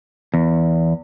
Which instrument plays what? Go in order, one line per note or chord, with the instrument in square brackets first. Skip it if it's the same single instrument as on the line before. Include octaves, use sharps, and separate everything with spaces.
[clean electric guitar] E2